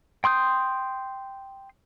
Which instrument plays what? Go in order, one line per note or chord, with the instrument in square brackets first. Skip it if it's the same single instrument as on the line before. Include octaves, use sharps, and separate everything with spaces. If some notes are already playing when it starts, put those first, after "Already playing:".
[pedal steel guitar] G5 C6 D#6 G6